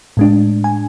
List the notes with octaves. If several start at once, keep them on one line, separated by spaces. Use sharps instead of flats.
A2 G#3 D4
G#5